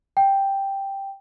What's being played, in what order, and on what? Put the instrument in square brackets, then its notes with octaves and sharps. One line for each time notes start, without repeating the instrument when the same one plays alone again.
[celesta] G5